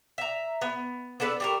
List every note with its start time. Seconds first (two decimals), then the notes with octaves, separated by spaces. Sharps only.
0.18 E5 A#5
0.61 B3
1.20 B3 D4 A4 B4
1.40 G3 A3 A#4